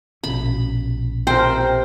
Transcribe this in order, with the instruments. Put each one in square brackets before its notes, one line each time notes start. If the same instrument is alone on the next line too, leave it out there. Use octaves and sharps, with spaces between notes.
[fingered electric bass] A#1 B2 C#4 [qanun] B5
[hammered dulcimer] C3 A#4 [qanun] C5 [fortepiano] G5